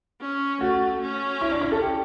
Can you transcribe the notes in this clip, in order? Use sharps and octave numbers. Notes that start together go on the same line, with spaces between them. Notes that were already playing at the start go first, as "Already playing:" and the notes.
C#4
A3 F#4
C#4
E4
D4
E4
A4
G4